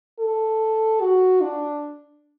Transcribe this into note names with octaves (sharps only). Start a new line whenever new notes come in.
A4
F#4
D4